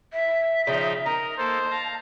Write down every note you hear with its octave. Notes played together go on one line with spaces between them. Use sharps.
E5
C#3 F3 D#4 G5
D#4 A#4 A#5
A#3 A4 C5 A5
F5 A#5